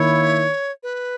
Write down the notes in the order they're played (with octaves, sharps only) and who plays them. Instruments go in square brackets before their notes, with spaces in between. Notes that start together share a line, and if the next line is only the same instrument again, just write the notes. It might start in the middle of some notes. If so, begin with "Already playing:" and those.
Already playing: [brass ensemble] D#3 A#3 E4 [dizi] C#5
[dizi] B4